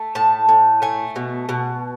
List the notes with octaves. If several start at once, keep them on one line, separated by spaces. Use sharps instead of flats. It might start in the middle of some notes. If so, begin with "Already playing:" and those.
Already playing: A3
A2 A5
A2
A3 G#5
B2
B2